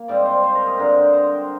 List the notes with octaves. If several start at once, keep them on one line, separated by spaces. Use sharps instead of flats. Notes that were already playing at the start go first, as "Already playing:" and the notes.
Already playing: A#3 F5
G#2 G3 C4 D5
C5
C5
A#4
G#4
G2 D3 G#3 C4 A#4
C5